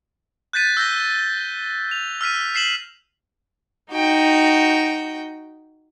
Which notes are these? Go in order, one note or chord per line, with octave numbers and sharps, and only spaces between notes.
F#6 G6 A6 B6 D#7
E6 G6 A#6 G7
F7
E6 F6 B6 D#7
B6 C7 E7 F#7
D#4 F#4 G5